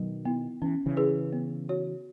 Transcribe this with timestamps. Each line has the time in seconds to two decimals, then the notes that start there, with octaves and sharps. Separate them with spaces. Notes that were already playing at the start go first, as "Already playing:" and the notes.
Already playing: B2 D#3 F#3
0.25 B3 E4
0.62 E3 C#4
0.86 C#3 E3
0.97 E4 G#4 B4
1.33 B3
1.69 F#4 C#5